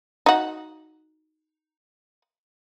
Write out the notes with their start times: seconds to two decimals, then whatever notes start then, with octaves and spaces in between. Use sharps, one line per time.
0.26 D#4 F#4